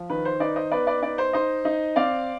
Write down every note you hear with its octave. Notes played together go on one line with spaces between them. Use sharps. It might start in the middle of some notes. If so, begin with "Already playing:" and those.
Already playing: F3
D#3 B4
C5
D#4 B4 D5
C5 D#5
B3 B4 D5
B4 D5
D#4 B4 D5
C5
D#4 C5 D#5
D#4
C4 D5 F5